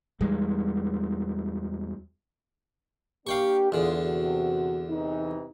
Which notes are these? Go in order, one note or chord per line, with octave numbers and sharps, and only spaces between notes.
E2 G3 G#3
A#3 D4 G4 F5 G5 C#6
E2 D3 F4 G#4
C3 F#4
C3 E3 D#4